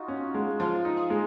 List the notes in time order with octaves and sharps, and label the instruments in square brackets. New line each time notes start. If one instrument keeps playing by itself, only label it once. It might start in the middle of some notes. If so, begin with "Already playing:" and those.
Already playing: [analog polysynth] D#4 F4 F#4
[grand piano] C#4
G#3
[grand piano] F3 [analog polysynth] F4
[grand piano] D#4
[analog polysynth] G#4
[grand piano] G#3